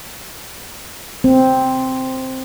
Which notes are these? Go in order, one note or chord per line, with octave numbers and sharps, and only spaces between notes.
C4